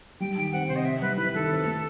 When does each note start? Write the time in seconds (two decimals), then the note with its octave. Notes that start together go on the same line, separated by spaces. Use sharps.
0.20 G3 G5
0.37 D#3 G5
0.52 C4 F#5
0.68 C3 C5
0.76 D#5
0.85 C4 E5
1.01 G3 B4
1.17 E4 B4
1.35 D#3 A4
1.51 C4
1.66 A3